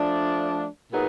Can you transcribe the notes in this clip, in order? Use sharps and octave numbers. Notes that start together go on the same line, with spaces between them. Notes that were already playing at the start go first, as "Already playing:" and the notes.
Already playing: F3 A3 D4
A#2 F#3 B3 D#4 G#4